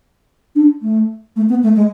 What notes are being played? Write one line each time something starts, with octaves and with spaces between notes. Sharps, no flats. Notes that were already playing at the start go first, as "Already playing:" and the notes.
D4
A3
A3
B3
A3
G#3